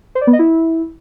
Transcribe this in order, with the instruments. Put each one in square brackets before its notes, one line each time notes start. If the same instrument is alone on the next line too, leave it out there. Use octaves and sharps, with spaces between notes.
[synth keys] C5
D5
B3
D#5
E4